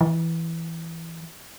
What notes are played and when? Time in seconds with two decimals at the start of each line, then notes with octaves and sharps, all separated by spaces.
0.01 E3